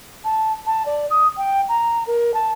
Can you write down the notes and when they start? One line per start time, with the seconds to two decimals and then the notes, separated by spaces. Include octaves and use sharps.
0.24 A5
0.67 A5
0.86 D5
1.10 D#6
1.37 G5
1.69 A#5
2.07 A#4
2.34 A5